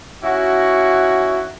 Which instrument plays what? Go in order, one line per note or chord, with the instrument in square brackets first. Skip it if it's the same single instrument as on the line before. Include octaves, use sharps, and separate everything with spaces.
[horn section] C#4 D#4 E4 F#4